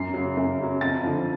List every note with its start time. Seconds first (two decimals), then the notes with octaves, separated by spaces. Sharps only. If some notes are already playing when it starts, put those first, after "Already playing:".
Already playing: F#2 C7
0.14 C#3 F#3
0.37 F#2
0.58 C#3 F#3
0.81 F2 A6
1.04 D3 F3